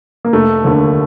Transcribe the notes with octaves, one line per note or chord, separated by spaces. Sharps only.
A#3
F1 A3
D#2 D3